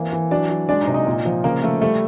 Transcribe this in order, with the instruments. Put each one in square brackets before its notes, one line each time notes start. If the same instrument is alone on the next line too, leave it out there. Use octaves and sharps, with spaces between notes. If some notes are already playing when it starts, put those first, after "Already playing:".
Already playing: [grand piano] E3 A#3 [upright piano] C4
[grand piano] E3
[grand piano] F#3 [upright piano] D4 D5
[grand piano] F#3
[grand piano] G#3 [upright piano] D4 D5
[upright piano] D#4 D#5
[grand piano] C3
[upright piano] D#4 D#5
[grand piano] A#2
F3
[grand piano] C#3 [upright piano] A#3 A#4
[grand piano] F3 [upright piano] A3 A4
[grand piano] G3 [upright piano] A3 A4